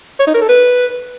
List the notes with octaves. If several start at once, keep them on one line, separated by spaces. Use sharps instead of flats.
C#5
D#4
A#4
A4
B4